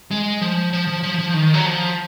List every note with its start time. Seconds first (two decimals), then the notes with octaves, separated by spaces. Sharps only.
0.11 G#3
0.41 F3
0.73 F3
0.87 F3
1.03 F3
1.18 F3
1.34 D#3
1.54 F#3
1.65 F3